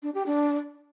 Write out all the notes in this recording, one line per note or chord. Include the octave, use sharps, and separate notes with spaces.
D4
G4
D4